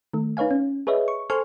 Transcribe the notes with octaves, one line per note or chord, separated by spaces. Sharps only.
D#3 A3
D#4 B4 C#5 F5 G#5
C#4
G#4 B4 C#5 D#5 E5
C#6
A4 C5 G#5 C6 C#6 F6